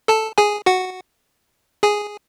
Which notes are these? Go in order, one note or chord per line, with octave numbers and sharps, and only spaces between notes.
A4 A5
G#4 G#5
F#4 F#5
G#4 G#5